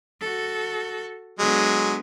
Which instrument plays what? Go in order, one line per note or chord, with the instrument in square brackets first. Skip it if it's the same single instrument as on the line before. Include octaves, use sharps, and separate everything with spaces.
[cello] F#4 A4
[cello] D3 B3 [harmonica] F#3 G#3